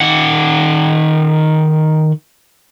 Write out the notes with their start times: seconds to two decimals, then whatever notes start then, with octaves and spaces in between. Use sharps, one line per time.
0.01 D#3 F#5